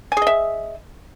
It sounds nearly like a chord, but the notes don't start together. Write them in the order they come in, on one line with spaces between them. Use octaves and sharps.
G#5 G#4 D#5 E5